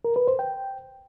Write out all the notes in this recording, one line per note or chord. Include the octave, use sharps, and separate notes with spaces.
A#4
B4
C5
G5